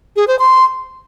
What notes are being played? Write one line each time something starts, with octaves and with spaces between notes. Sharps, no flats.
G#4
C5
C6